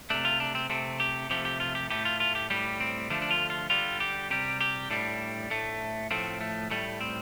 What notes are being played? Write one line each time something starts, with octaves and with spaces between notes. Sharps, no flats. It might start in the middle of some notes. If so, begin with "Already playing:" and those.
C3 A3 D4
F4
D4
C4
C3 A3 C4
G4
C3 F3 A3 G4
G4
F4
G4
A2 A3 G4
F4
F4
G4
A2 G3 G4
C4
D3 F3 A3 D4
D4
F4
F4
D3 G3 F4
G4
C3 G3 G4
G4
A2 G3 D4
A2 A3
A2 F3 A3 C4
A3
A2 G3 A3
C4